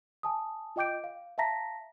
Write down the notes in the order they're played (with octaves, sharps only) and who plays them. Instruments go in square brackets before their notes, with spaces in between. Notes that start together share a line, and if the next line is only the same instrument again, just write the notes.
[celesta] G#5 A5 D#6
F4 D#5 G5 D6 G6 D7
F5
E5 F5 A5 A#5 A#6 B6